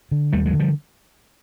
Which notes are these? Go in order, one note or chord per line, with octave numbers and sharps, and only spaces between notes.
D3
D#2 G3 A3
F#3 G#3
D3
F3 G3